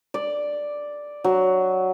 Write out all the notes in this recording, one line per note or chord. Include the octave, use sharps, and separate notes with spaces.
D5
F#3